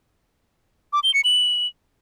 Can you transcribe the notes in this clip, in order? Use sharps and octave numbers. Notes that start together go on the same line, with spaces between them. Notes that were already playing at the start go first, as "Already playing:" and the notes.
D6
G7
C#7
F#7